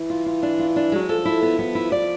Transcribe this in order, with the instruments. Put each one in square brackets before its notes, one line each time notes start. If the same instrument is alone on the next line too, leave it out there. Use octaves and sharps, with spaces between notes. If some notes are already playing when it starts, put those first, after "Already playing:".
Already playing: [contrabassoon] E3
[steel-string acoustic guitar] F4
F4
D4
F4
D4
[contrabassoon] F#3 [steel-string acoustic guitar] G#3
[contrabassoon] F3 [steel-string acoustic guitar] A4
[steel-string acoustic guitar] E4
B3
B3
E4
D5